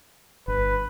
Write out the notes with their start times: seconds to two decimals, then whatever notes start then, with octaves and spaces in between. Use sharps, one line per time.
0.48 G1 B4